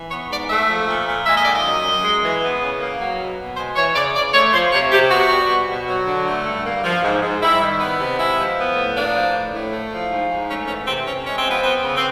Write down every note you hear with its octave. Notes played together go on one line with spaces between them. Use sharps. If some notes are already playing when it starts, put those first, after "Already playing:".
Already playing: E3
B3 C#5
G#2 D5
A3 E5
F3
A#2
A#2
G#3 E5
D#5
D#3 D5
D#5
F#2
F#2
G#3
E3
B3
C#3
A#3
F#3
B2
B2
G#3 C5
E3 C#5
C#3 D5
C#3 D5
A3 C#5
F3 C5
C3 C#5
C3 G4
B3 F#4
G3
B2
B2
F#3
D3
A3
G2
A#3
F3
G#2
G#2
G3 E4
D#3
B3
C3
G#3 E4
F3
B3
A2
A#3 D4
F3
A2
A2
A3
F3
G#2
G#2
A3 C#4
E3 C#4
C3 C4
C3 C#4
G#3 C#4
C4
F3 B3
B3 C4
C#3
C4